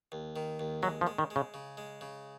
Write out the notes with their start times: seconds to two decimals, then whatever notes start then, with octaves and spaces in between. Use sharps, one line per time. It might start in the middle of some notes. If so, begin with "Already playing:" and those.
0.12 D#2
0.36 D#3
0.60 D#2
0.83 F#3 G#3
1.01 F3
1.07 G#3
1.18 D#3
1.30 G#3
1.36 C#3
1.54 C#3
1.77 G#3
2.01 C#3